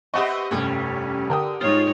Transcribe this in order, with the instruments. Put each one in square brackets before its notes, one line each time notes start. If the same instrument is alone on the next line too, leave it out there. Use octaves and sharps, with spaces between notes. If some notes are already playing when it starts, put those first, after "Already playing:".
[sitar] B3 C4 G4 [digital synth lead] D#5 [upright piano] E5 F#5 C#6
[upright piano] F1 G2 [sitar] G3 [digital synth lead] C#4
[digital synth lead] D3 [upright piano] A#4 G5 D#6
[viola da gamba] G#2 D#4 C#5 [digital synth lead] F4